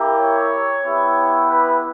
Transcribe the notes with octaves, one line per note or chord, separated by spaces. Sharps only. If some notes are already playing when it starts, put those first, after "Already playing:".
Already playing: A#3 E4 G4
C#5
B3 E4 G4
B4